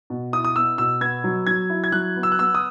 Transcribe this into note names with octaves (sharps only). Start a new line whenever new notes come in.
B2
E4 D#6
D#6
B3 E6
B2 E6
B3 G#6
F#3
F#3 G#6
E4
G#6
F#3 F#6
B3
E6
F#6
B3 E6
D#6